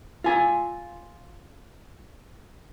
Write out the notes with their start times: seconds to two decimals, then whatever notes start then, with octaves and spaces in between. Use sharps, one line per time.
0.24 F4 G#5